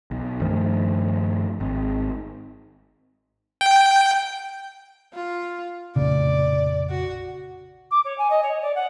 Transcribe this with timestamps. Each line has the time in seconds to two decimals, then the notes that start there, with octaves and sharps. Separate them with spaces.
0.11 B1
0.41 G2 D#3 F3 A3
1.60 G#1
3.61 G5
5.14 F4
5.96 F1 A#1 C#3 D5
6.90 F#4
7.91 D6
8.05 C#5
8.18 G#5
8.30 D#5
8.42 C#5
8.61 D5
8.75 F#5